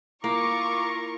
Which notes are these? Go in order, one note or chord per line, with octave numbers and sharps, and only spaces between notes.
A#3 E4 F4 A#4 A#5 C#6 D6